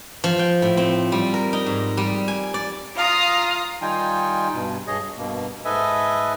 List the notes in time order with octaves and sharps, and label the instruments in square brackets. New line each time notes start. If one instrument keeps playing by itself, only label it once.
[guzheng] F3
G5
A2
C4
G3
A#4
D#4
G#2
G3
G#5
D5
[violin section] F4 A#5 D#6 [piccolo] F5
[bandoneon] D#3 G3 D#4 F4 G5 G#5
G2 B2
G2 G#4 C#5 D#5
G2 B2 A#3
G#2 A4 B4 D#5 E5 G#5